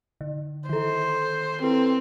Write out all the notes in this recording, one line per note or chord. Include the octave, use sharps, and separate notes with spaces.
D3
D#3 A4 C5
C4 E4 A4 B4